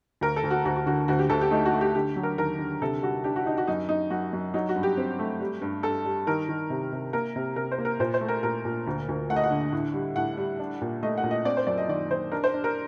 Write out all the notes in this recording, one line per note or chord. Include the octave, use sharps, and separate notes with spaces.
D2 A#4
A4
D2
F#4
D2 F#4
F#4
D3 F#4
D2 F#4
G4
D2 A4
G4
A3 D#4
F#4
A3
G4
D3 G4
F#3
A#4
D#2 A#4
D3
C3 A4
G3 F#4
D4 G4
F#4
D4 D#4
F#4
F#2 D#4
F#2 D#4
F#2 F#4
F#2
F#3 D#4
F#4
G2
G4
C4
A3
G3
G2
G2 A4
G3
D#3 A#4
D#3
C3
C3
A#3 A#4
C3
C3 A#4
C5
A#3
A#4
A#2 C5
C5
A3
A#4
A#2 A#4
A#2
D2
D2
A3 F#5
D#5
F#5
D3
A2
G3
A2 F#5
G3
D4
A#2
A3 D#5
F#5
A#2
D#5
C4 D5
C5
F#2 D5
D#5
D#3 D5
D#3 C5
D4 A#4
C5
D4
A#4